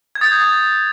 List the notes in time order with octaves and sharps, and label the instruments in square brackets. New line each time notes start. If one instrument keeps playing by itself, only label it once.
[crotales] G#6
D#6 G6 A6